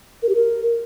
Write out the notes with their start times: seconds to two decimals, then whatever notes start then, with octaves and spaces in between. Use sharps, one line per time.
0.23 A#4
0.29 G4
0.35 A#4